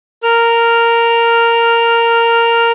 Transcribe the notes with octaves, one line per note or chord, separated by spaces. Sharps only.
A#4 F6